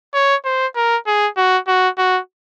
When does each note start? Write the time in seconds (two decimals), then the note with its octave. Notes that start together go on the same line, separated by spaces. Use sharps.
0.14 C#5
0.45 C5
0.76 A#4
1.07 G#4
1.37 F#4
1.67 F#4
1.98 F#4